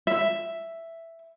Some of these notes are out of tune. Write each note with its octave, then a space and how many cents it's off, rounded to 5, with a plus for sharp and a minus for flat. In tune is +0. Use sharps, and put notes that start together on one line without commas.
E5 +5